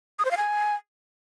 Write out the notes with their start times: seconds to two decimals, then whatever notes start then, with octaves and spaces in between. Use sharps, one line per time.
0.19 D#6
0.25 C5
0.31 F5
0.37 G#5